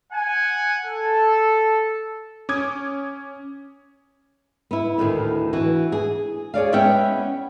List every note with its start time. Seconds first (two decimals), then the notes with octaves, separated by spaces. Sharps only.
0.13 F#5 G#5
0.85 A4
2.49 C#4 D6 D#6 G#6
4.71 B3 E4
4.98 D2 A2 D#3 B3
5.53 E3 F#4
5.92 G#4
6.54 G#4 C#5 D5 F5
6.72 G#3 B3 C#4 E5 F#5 G5